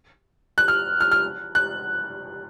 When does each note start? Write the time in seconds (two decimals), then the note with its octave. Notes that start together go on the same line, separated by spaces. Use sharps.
0.58 F#6
0.68 F6
1.00 F6
1.11 F6
1.55 F#6